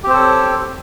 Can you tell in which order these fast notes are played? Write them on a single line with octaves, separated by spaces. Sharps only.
G4 C4 C5 A4 C#5